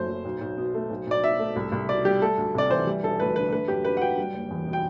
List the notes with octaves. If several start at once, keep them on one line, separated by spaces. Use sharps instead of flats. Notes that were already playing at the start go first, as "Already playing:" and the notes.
Already playing: F#1 F#2 A3 C5
F#3
B1
B1
B2
A3
B1
B1 D5
B2 E5
A3
C2
C2
B2 D5
G3 G4
A3 A4
D2
C3 D5
E3 C5
G3
E1 A4
D2 B4
D3 B4
A3 B4
F#2 G4
D3 B4
F#5
F#3 G5
G3
F#1
E2
B2
G5